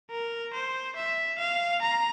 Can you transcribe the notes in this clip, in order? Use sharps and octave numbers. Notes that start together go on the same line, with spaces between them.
A#4
C5
E5
F5
A#5